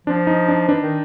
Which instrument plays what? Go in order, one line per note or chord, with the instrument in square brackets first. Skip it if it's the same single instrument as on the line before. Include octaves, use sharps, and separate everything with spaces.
[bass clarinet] F3 [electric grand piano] D4
[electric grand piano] D#4
D4
[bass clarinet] E3 [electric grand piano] D4
[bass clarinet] D#3